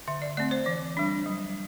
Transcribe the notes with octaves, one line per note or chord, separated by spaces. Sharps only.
D3 E5
D5
A3 C4 D5
C5
E3
G3 D4
F#3